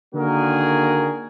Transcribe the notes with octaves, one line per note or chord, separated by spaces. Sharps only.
D3 D#3 A#3 F#4 G#4 A#4